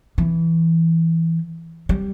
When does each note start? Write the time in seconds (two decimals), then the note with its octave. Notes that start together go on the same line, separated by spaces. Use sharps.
0.18 E3
1.89 G3